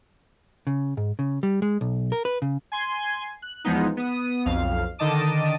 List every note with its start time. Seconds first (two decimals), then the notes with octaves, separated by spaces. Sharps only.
0.67 C#3
0.97 G#2
1.19 C#3
1.43 G3
1.62 G#3
1.81 B1
2.12 A#4
2.25 B4
2.42 C#3
2.72 G#5 C6 G#6
3.42 F#6
3.65 E2 F3 G#3 B3 D#4
3.97 B3 D#6
4.46 B1 F2 F5
4.99 D3 D#3 D#5 A5 D6 D#7